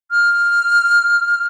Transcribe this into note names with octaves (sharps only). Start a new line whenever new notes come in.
F6